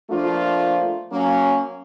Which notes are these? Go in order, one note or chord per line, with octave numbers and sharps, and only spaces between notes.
F3 A3 A#3 D4 F4
F#3 A#3 C#4